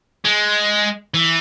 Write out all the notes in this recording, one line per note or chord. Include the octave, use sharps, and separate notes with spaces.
G#3
E3